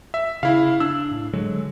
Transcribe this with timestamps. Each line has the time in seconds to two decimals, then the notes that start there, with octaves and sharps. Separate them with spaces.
0.14 E5
0.43 C#3 E4 F5
0.80 D4 E6
1.11 A2
1.33 D3 F#3 G#3